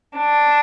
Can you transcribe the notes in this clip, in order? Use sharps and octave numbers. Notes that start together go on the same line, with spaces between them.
D4